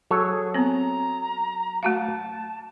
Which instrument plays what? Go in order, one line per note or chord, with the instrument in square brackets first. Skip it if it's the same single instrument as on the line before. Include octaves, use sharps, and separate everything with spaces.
[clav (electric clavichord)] F#3 A4 C#5 [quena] G#4
[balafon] B3 C4 [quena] A#5
[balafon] A3 F#4 F5 [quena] A5